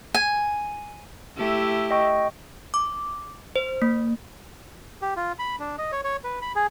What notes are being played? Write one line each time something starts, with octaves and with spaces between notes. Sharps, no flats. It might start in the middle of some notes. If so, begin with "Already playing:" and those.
G#5
A3 E4 G4
D#5 G5 C#6
D6
C5
A#3
G4
F4
B5
D4
D#5
C#5
C#5
B4
B5
G#4